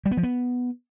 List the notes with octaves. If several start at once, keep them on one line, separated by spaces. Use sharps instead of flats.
G3
B3
F3
B3